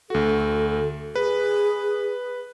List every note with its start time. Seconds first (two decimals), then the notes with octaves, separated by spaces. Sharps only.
0.10 D2 F#4 A4
1.16 G#4 B4